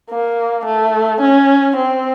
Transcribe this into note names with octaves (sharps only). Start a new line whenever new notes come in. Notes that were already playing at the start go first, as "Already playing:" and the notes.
A#3
A3
C#4
C4